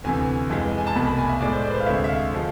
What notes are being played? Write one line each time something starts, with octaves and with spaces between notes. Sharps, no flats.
D2 C3 E3 G#5
F2 E3 G#3
G#5
A5
C2 B2 A3 B5
B5
G#5
E5
A2 G#3 D5
C5
D5
B4
C5
F5
D2 C3 G#3 E5
E5
F5
D3 F3 G#3